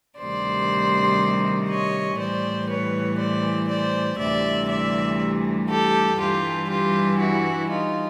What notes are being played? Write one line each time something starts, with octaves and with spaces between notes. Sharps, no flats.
D2 C3 D#3 G3 C5 D5
C#5 D#5
A2 E3 G3 C5 D5
B4 C#5
C5 D5
C5 D5
D2 C3 E3 G3 D5 E5
D5 E5
G4 A4
G2 E3 G3 F4 G4
F4 G4
E4 F#4
D#4 F4